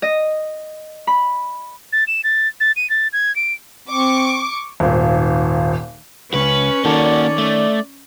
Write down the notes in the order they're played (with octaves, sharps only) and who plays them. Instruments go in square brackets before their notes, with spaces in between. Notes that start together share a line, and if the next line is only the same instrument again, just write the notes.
[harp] D#5
B5
[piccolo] A6
E7
A6
A6
D#7
A6
G#6
D7
[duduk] C4 [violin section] C#6 D6
[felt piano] D#1 G#1
[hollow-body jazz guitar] C#2 [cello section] C#4 [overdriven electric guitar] B4
[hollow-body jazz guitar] D#3 A4 [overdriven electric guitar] A#3 F#4 [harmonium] D5
[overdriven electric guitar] A3